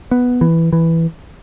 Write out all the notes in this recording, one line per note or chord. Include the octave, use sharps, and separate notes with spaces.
B3
E3
E3